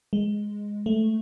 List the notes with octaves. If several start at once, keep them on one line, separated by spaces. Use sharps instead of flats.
G#3
A3